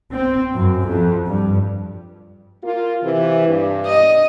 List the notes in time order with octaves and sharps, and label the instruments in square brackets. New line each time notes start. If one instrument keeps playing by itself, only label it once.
[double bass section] C4
F#2
F2
G2
[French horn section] A#3 F4
C3 E3
G2
[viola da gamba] D#5